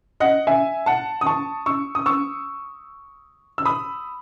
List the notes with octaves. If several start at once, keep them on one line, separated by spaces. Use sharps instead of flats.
D#5 F#5
E5 G#5
F#5 A5
D#6
A5 C#6
C#6 E6
D#6
C#6 E6
E6
B5 D#6